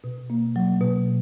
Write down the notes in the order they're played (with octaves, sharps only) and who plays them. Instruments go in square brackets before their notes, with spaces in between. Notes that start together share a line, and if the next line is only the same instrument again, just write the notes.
[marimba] B2
A#3
F#3
B2